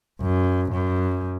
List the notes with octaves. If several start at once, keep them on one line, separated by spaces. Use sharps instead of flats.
F#2
F#2